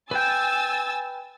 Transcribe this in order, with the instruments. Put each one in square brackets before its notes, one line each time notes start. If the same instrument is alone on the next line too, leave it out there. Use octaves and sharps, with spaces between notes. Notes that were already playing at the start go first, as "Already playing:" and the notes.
[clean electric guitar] B4 G5 [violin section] G#5 E6 A6